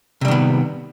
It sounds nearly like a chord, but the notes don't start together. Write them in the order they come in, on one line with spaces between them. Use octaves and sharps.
C3 G3 D#3 B3